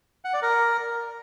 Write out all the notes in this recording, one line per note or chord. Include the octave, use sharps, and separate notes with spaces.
F#5
D5
A#4